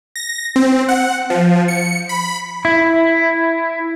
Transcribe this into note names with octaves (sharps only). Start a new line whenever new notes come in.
A#6
C4
F#5
F3
C#7
B5
E4